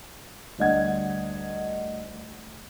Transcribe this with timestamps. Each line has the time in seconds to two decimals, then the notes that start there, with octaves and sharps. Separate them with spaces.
0.58 D2 G3 D4 D#5 F#5 G#6